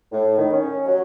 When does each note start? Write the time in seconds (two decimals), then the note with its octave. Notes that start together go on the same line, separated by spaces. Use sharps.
0.11 A2
0.38 D#3
0.52 C#4
0.86 F#3